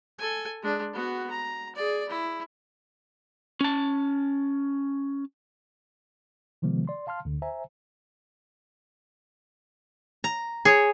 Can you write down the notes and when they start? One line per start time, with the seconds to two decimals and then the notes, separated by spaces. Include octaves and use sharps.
0.18 A4 G#5
0.62 G#3 D4
0.93 B3 F#4
1.30 A#5
1.75 G#4 D5
2.08 E4
3.61 C#4 A5
6.62 C3 D#3 F3 G#3 B3
6.88 D5 C6
7.07 F5 A5 C6 F6
7.25 D2 D3
7.42 C5 E5 G#5 A#5
10.24 A#5
10.65 G#4 C#5